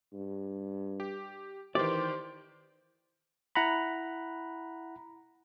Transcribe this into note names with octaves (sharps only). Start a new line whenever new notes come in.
G2
G4
D#3 E3 G4 C5 D5
E4 F#5 A#5 B5